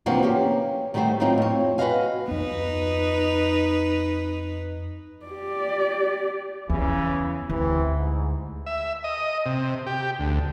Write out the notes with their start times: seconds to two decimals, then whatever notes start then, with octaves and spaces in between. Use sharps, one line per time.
0.06 C3 E3 F3 A#3 D4 F#4
0.23 A#3 C#4 G4
0.94 D#3 G3 A3 F#4 C5
1.20 A2 F#3 A#3 C4 D#4 F4
1.38 F2 C#5
1.78 F#4 B4 C5 D#5 F5 G#5
2.28 F2 B3 D#4 B4
5.26 G4 D5
6.69 E2 C#3 E3
7.49 D2 C3 E3
7.96 G#2
8.66 E5
9.04 D#5
9.46 C3
9.86 G4
10.19 D2